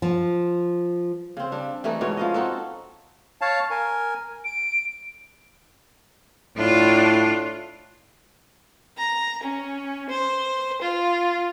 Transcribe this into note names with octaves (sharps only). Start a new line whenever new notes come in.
F3
C#3 C4
G3 D4
E3 G3 A3 D#4
G#2 B2 E3 C#5
F3 C#4 D#5
C4 D#4 F#4 A4
C#5 F5 A5
A#4 G#5
D7
A2 D4 F4
A#5
C#4
C5
F4